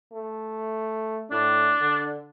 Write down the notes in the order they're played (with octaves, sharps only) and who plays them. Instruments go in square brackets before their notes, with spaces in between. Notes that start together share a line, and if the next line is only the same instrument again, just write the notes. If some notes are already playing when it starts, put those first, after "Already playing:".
[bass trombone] A3
[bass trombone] A2 [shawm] D4
[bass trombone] D3